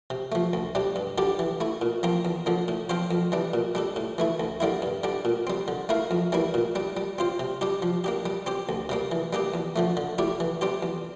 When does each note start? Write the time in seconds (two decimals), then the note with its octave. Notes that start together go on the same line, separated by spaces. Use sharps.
0.10 C3
0.32 F3 A3
0.53 D2
0.75 C3 G3 D4
0.96 G2
1.18 D3 G3 D4 G4
1.39 E3
1.60 A3 E4
1.82 A#2
2.03 F3 C4 F4 A#4
2.25 E2
2.46 D3 F3 A#3
2.68 A2
2.89 F3 C4 F4 C5
3.11 F2
3.32 E3 G3 D4
3.54 A#2
3.75 G3 D4 A4
3.96 A2
4.18 E3 A3 E4
4.40 D2
4.60 D3 G3 A#3 E4
4.82 G2
5.04 D3 G3 D4
5.25 A#2
5.47 G3 C4
5.68 D3
5.89 A3 E4 A#4 F5
6.11 F2
6.32 E3 G3 A#3 E4
6.54 A#2
6.75 G3 D4
6.97 G3
7.18 C4 F4 C5
7.39 C3
7.61 G3 D4 G4
7.82 F3
8.04 A#3 D4 G4
8.26 G3
8.46 C4 G4 C5
8.69 D2
8.89 C3 G3 A#3
9.12 E3
9.33 G3 A#3 D4 G4
9.54 E2
9.76 D3 F3 A3
9.97 D3
10.18 A3 E4 G4 D5
10.40 E3
10.61 G3 C4 G4
10.83 E2